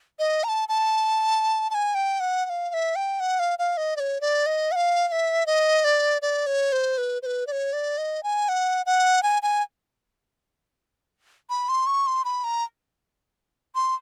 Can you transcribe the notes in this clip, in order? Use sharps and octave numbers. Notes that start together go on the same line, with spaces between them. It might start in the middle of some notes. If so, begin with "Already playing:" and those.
D#5
A#5
A5
A5
A5
G#5
G5
F#5
F#5
F5
F5
E5
G5
F#5
F5
F5
D#5
D5
C#5
D5
D#5
F#5
F5
F5
E5
D#5
D5
D5
C#5
C5
B4
C5
B4
D5
C#5
D5
D#5
G#5
F#5
F#5
G#5
G#5
B5
C6
C#6
C6
B5
A#5
C6